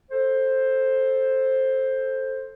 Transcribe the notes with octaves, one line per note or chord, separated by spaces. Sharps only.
A4 C5